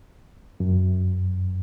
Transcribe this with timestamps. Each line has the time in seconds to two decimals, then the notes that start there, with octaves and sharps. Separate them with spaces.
0.60 F#2